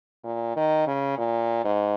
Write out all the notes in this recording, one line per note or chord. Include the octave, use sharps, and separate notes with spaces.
A#2
D#3
C#3
A#2
G#2